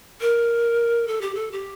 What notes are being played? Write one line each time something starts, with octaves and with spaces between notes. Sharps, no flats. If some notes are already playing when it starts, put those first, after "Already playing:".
A#4
A4
G4
A4
G4